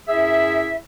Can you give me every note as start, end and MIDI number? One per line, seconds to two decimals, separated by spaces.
0.08 0.75 42
0.08 0.75 64
0.08 0.75 68
0.08 0.75 76